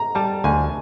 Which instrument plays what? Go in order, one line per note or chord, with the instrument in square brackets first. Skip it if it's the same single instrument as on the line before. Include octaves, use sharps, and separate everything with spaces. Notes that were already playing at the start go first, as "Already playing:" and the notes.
Already playing: [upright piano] A#5
[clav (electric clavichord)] G3 [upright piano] A5
[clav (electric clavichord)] D2 [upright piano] G#5